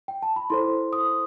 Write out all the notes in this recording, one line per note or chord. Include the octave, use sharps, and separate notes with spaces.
G5
A5
B5
E4 A4 C5 C6
D#6